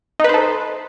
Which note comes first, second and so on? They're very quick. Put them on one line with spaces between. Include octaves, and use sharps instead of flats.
D#4 B4 C5 A4